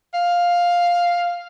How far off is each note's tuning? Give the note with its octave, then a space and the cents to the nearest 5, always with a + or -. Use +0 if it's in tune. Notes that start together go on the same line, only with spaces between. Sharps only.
F5 +5